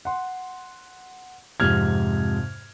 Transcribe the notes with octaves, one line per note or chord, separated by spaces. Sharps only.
F#5 C6
F2 G#2 C3 F6 G#6